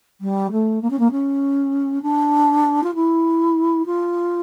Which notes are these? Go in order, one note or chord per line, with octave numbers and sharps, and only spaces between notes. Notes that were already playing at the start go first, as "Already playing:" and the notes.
G3
A3
A#3
C#4
A#3
C#4
D4
F4
E4
F4